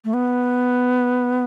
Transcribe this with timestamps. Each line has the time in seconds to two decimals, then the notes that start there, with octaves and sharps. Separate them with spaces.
0.05 A3
0.14 B3